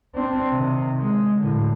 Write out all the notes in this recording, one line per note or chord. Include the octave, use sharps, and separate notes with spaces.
C4 D4
C3 D#3
G#3
A2 D3